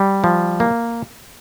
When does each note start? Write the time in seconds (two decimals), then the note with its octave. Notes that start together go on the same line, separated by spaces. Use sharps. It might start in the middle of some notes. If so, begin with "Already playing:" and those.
Already playing: G3
0.24 F3
0.60 A#3